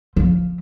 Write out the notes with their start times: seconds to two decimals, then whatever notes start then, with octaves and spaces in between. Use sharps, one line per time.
0.16 F3